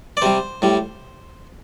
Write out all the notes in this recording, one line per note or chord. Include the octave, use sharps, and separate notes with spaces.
D5
C3 G3 C5
A2 G3